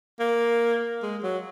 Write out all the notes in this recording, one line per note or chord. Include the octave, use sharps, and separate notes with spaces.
A#3
G#3
F#3